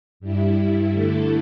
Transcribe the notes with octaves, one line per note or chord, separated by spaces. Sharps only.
G2 G3 E4
D3 A3 E4 A4